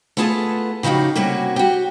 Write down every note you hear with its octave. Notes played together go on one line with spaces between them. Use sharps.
A3 B3 F4 G#4 A5
C#3 F3 D#4 F#4 G4
C3 G3 A#3 C#4 F#4
F#4 G4